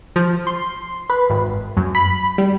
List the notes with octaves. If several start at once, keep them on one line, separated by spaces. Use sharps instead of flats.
F3
C6
B4
G#1
F#2
B5
G3